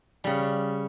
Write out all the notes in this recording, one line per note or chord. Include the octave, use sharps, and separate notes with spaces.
C#3 G3